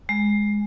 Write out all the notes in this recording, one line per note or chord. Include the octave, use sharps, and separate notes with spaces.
G#3